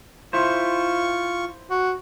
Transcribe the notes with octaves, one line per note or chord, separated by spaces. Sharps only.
E4 F4 C5 C#6
F#4